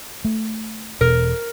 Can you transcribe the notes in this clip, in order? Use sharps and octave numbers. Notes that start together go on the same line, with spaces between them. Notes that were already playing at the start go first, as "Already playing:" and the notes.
A3
E1 B2 A#4